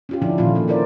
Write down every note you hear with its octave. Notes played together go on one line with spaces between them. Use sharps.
C#4 F4 G4
D3 F3 D4 E4
A#2 D3 D#3 F3 C#4 F4
A#3 C#4
C#4 E4 A#4 C5 D5